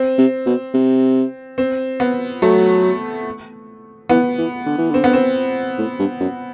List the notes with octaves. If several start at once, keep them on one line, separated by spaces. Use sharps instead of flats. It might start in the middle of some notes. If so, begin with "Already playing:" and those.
Already playing: C4
C3
B2
C3
C4
B3
F#3 A3
E3 B3
E3
D3
E3
D3 C4
B3
C4
A2
G2
F#2